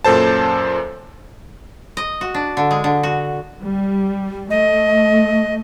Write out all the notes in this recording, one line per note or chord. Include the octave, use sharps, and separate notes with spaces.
F#2 A#2 A4 C5 A5
D#5
F#4
D4
D3
G#3
D3
F#4
G3
A3 D#5